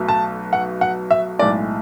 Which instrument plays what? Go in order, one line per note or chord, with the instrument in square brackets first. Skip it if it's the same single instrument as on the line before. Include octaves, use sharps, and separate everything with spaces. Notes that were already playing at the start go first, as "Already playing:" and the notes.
Already playing: [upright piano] B1 B2 A3
A5
F#5
F#5
E5
B1 A2 G#3 D5